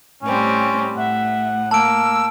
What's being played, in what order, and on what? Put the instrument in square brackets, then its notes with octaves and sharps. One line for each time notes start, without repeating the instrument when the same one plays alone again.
[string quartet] A2 G3 C4 [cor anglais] C#4
[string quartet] A2 [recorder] E5 [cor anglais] F#5
[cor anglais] A#3 [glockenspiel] A5 D7 [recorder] E6